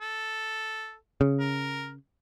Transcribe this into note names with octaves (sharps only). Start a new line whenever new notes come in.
A4
C#3
A#4